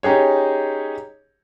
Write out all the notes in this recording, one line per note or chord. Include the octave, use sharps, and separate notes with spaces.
C#4 D#4 G4 G#4 C#5